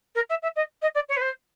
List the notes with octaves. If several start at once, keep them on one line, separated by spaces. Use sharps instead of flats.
A#4
E5
E5
D#5
D#5
D5
C#5
B4
C5